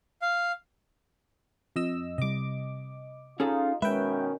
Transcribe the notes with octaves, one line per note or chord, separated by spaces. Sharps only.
F5
F2 D#5 E6
C3 G3 D#5 D6
C#4 D#4 F4 G#4 A4
B2 D#3 G#3 C#4 B4 E5 G5